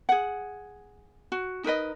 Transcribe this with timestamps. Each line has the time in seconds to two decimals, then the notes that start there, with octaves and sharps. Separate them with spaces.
0.09 G#4 F#5
1.32 F#4
1.64 D#4 A#4 B4 D#5